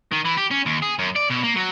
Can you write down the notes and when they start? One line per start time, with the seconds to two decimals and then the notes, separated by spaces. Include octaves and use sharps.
0.12 D#3
0.25 E3
0.37 G4
0.51 C#4
0.66 D#2
0.82 G#4
0.99 F#2
1.15 D5
1.30 B2
1.43 A#3
1.56 F#3